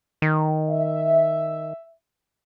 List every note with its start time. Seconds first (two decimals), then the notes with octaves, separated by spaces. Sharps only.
0.22 D#3
0.69 E5